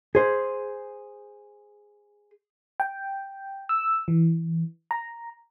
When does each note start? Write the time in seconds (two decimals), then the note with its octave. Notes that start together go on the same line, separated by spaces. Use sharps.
0.15 G#4 C5
2.80 G5
3.69 E6
4.08 E3
4.91 A#5